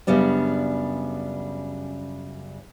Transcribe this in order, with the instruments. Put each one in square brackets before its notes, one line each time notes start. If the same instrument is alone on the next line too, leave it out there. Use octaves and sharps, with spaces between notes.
[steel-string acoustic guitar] F#2 C#3 G3 B3 D4